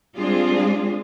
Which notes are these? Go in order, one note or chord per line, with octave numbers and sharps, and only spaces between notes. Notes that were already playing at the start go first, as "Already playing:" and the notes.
G3 G#3 C4 D4 F4 G#4